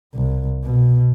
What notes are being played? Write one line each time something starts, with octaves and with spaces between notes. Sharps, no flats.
C2
B2